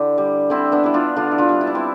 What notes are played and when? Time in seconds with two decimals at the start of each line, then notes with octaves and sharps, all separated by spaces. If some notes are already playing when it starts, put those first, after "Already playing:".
Already playing: D3 E4 G4
0.18 G3
0.50 D3 C4 E4
0.72 B3 D4
0.84 G3 E4
0.94 D4 F4
1.16 D3 D4 F4
1.31 E4
1.38 D4 F4
1.49 G3
1.61 E4
1.67 D4
1.75 C4 E4